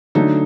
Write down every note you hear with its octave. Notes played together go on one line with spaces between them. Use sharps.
D3 F#3 A3 D#4